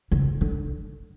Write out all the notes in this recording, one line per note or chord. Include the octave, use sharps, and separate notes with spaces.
C#3
D3